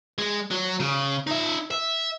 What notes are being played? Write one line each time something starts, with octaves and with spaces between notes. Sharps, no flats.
G#3
F#3
C#3
D#4 E5
E5